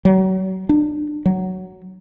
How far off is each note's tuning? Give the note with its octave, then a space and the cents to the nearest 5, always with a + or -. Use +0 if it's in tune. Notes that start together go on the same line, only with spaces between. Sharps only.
F#3 +30
D4 +35
F#3 +5